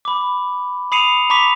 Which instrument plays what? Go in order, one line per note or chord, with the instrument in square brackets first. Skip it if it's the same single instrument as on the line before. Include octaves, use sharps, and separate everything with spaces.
[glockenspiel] B5 D6
B5 D#6 C7 C#7 D#7 F7
A#5 B5 C#6 D6 B6 F7